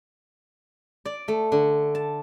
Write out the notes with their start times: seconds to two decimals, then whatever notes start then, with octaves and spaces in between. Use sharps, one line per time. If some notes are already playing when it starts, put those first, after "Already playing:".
1.05 D5
1.28 A3
1.52 D3
1.95 A5